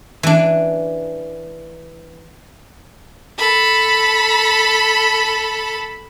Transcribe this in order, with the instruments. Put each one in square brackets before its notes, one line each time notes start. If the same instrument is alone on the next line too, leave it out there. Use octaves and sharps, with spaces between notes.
[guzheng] E3 D4
[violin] A4 B5